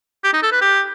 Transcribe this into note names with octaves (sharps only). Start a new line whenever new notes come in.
G4
D#4
A4
B4
G4